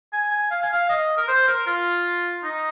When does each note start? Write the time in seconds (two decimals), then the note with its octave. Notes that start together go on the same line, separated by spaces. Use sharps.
0.13 G#5
0.31 G#5
0.51 F5
0.63 G#5
0.73 F5
0.89 D#5
1.17 A#4
1.28 C5
1.48 A#4
1.67 F4
2.44 D#4